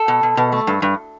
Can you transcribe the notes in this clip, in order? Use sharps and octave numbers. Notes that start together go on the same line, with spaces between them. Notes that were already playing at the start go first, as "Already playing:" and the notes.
Already playing: A4
B2
B2
B2
A3
G2
G2